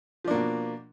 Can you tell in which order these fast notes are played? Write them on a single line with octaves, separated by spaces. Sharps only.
F3 D4 A#3 B2